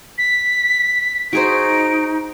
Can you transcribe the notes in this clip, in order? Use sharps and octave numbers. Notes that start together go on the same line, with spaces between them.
B6
D#4 F#4 G#4 C5 D7